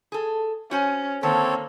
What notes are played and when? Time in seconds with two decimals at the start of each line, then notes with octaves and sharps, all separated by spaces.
0.12 G#4 A4
0.71 C#4 F#4 C5 G#5
1.23 D3 D#3 A#3 C4 A4 C#5 A5